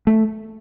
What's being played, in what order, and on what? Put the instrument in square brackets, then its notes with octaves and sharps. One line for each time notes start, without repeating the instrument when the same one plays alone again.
[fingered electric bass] A3